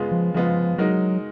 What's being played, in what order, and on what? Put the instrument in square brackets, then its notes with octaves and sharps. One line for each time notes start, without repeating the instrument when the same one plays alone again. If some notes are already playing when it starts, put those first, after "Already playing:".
Already playing: [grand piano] C#3 G#3 B3 F4
[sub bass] F3
[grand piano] C#3 G#3 B3 F4 [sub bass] F3
[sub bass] F#3 [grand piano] G#3 D#4 F#4 A#4